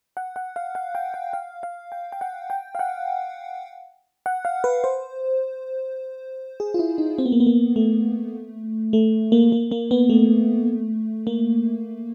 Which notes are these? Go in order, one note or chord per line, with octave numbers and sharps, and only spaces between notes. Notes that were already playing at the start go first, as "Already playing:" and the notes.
F#5
F#5
F5
F#5
G5
F#5
F5
F5
G5
G5
F#5
G5
F5
F#5
F#5
F5
B4
C5
G#4
F4
E4
D#4
C4
B3
A#3
B3
A#3
A3
A3
A#3
A#3
A#3
B3
A3
A#3